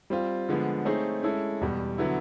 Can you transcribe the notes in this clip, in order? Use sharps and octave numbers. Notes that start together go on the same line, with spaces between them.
G3 C4 F4
D3 F3 G#3 B3
A3 C4 D#4 G#4 C#5
G#3 C#4 E4 A4
E2 B2 G3
D3 F#3 B3 E4